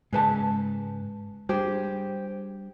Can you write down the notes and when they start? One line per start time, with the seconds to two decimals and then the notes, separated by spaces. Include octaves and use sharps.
0.13 G#2 C#3 G#3 B4 A5
1.49 G3 D4 G4 G#4 C5